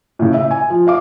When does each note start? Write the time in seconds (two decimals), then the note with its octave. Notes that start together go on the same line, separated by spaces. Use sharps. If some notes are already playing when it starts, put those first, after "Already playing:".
0.19 A2 C#3
0.34 E5
0.51 G#5
0.70 F3
0.87 E5 F5 D6